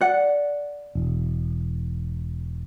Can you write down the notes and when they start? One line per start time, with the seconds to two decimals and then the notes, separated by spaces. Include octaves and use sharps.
0.01 D5 F#5
0.95 E1